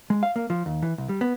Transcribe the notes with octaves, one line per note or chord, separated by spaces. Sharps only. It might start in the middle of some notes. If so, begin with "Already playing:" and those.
G#3
F5
A#3
F3
D#2
E3
C2
G3
B3